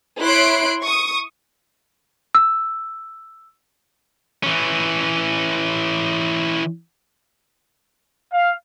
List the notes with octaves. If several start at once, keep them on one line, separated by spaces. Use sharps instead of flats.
E4 C#5 C6 F#6 C7 D7
C#6 D#6
E6
E3 C#4
F5